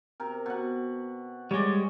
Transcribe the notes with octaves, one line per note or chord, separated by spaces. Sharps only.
C3 A#4
B2 F#5
G3 G#3 C#5 D5